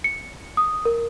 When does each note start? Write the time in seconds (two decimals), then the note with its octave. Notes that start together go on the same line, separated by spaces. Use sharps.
0.04 C#7
0.57 D#6
0.85 A#4